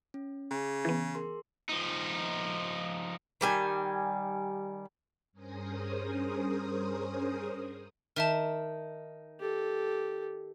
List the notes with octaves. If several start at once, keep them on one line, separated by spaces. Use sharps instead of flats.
C#4
C#3 G#4
E3 B3
G#4 A#4 C6
F3 D#4
D#3 G3 G#5
G2 C#4 G#4 A#4 C5 D#6
D#3 A#4 E5 A5
G4 A4